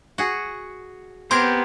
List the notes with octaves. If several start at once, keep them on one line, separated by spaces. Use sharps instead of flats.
F#4 G#4
B3 C4 G4 A#4 C6 G#6 C7